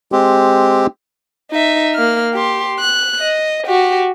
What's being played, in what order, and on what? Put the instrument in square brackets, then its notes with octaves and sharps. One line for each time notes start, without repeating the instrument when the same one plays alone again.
[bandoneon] G#3 C4 G4
[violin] D#4 E5
A#3 F6
G4 C6
F#6
D#5
F#4 G4